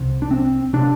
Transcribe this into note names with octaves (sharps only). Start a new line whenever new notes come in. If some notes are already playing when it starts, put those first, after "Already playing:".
Already playing: C2 C3
D4
C4
C3 D4